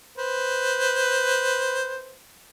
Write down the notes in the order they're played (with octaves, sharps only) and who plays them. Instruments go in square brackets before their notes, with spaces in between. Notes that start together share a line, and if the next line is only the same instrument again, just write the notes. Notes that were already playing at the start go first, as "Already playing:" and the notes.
[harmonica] B4 C5